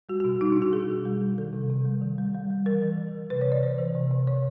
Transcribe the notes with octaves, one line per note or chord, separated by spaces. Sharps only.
G3 F#4
B2 F#4
G3 D#4
B2 D4
F#4
B2 G#4
B2
G3
G3
D#3 A4
C3
C3
G3
D#3
G3
G3
G3
E3 A#4
E3
E3
E3
C3 B4
C#5
C3
D5
E3 C5
E3
C3
C3
C3 C#5